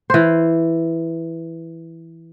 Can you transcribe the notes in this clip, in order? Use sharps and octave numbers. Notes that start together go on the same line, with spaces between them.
E3 C5